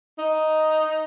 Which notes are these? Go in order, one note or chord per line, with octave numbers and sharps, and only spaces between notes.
D#4